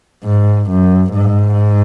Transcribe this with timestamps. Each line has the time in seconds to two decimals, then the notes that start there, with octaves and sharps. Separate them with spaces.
0.24 G#2
0.70 F#2
1.16 G#2